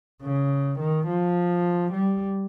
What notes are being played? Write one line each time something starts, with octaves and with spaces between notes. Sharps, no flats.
C#3
D#3
F3
G3